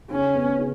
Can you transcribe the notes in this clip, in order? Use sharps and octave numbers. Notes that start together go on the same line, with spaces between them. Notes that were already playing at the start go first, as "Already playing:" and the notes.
C#3 C#4
B3
C#3